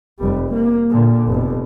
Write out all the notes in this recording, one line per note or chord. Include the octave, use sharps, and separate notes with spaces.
F1 G3
A#3
A#2 D3
F1 B2